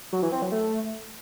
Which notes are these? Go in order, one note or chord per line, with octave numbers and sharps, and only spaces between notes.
F#3
E3
C4
F#3
A3